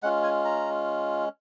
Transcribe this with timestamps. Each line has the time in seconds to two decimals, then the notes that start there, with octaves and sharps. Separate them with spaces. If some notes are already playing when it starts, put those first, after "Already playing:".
0.03 G#3 C#4 F4 F#5
0.23 G#5
0.45 A#5